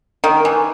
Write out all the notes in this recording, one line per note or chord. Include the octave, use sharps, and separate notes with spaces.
D#3
E3